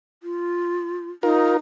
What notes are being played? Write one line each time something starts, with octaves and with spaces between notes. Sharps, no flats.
F4
D#4 F4 A#4